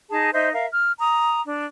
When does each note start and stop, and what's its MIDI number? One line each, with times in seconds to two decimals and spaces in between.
0.10 0.30 63
0.10 0.30 68
0.10 0.30 81
0.33 0.51 63
0.33 0.51 72
0.33 0.51 75
0.33 0.51 76
0.53 0.66 70
0.53 0.66 76
0.53 0.66 77
0.73 0.92 89
1.00 1.41 82
1.00 1.41 87
1.48 1.64 62